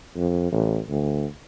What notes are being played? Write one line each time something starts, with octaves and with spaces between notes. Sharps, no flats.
F2
A1
D2